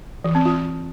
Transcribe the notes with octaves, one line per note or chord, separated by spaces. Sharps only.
E3
C4
F4